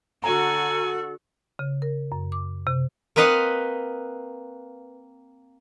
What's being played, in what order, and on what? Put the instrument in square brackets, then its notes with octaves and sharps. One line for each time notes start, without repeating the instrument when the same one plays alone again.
[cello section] D3 F#4 [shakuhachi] A4 [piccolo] G#5 [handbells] A#5
[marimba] C#3
A#4
F#2
D6
C3
[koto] A#3 C4 B4 D#5 F5 F#5